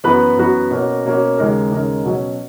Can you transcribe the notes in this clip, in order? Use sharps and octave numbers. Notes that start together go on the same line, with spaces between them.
F#2 E3 B3 F#4 B4
F#2 E3 B3 F#4 B4
B2 A#3 C#4 F#4
B2 A#3 C#4 F#4
D#2 C#3 G#3 D#4 A#4
D#2 C#3 G#3 D#4 A#4
B2 F#3 C#4